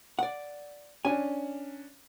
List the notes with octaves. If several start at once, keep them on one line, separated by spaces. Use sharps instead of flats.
D5 F#5
C#4 D4 G#5